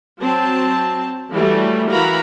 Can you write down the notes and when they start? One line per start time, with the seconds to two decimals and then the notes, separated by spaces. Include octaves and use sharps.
0.20 F#3 C4 A5
1.31 E3 F#3 G3 A3
1.90 E3 F#4 A#4 F5 A#5 B5